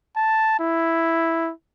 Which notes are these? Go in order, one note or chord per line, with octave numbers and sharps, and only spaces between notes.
A5
E4